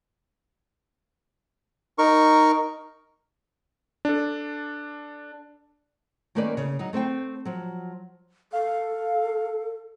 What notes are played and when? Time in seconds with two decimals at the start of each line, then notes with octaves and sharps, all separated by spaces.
1.98 D#4 A#4 C#6
4.05 D4 A4
6.35 D#3 A3 A#3 C#4 B4 D5
6.57 C#3
6.79 F#3 D#4
6.93 A3 C4 C5 G5
7.45 F3 F#3
8.53 A4 F5